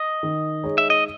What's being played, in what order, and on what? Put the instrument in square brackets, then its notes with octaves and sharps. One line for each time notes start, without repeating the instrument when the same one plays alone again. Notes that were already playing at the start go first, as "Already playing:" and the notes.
Already playing: [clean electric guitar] D#5
[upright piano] D#3
G#3 D#4 G#4 C#5
[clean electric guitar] E5
D#5